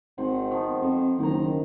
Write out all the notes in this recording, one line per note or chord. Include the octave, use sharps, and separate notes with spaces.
G#1 D#3 C5 F#5
D#3 F3 B3
F2
F#1 D#3 G5 A#5